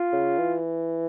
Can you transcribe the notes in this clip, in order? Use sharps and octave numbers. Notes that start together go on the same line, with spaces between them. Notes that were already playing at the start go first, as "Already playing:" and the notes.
Already playing: F4
C#3
E3